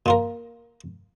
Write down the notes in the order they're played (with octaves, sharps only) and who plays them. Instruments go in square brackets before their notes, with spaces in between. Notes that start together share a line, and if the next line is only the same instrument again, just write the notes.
[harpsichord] A#2 F4 A#4